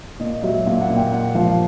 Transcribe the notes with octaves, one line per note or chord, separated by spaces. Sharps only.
A#2 D#5
F#3 E5
A#2 F5
F#5
A#2
G5
A#2 F#5
F3 F5